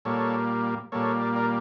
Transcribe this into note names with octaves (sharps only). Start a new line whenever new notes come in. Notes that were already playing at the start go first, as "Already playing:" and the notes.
A#2 G3 A#3 A4 C#5
A#2 G3 A#3 A4 C#5
D5
A#4 D5